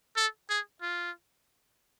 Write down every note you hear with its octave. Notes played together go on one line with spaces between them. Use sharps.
A4
G#4
F4